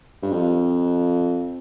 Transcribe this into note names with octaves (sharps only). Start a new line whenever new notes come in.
G2
F2